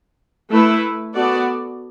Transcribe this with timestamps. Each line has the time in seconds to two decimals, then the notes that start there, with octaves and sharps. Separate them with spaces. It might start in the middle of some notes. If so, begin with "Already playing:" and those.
0.51 A3 E4 B4
1.14 B3 F#4 A4 D5